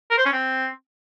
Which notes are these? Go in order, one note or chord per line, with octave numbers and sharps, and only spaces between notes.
A#4
C5
C#4
C4